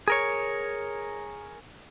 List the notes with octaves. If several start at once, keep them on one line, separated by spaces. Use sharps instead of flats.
G#4 A#4 C#5